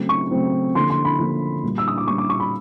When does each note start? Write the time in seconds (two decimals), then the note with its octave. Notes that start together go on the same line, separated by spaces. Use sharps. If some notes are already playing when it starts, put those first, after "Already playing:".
Already playing: C#3 F#3 A3 C4
0.09 C#6
0.31 C#3 F#3 A3 C4
0.75 D3 F3 A#3 C6
0.90 C6
1.05 B5
1.19 D3 F3 A#3
1.63 A#2 G3 A#3
1.78 E6
1.88 D#6
1.97 D6
2.07 A#2 G3 A#3 C#6
2.18 D6
2.29 C#6
2.40 B5